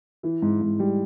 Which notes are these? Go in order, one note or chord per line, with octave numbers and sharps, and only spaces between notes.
E3
G#2
G#2
G3